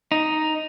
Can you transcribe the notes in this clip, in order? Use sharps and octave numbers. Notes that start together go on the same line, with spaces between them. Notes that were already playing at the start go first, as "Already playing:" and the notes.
D#4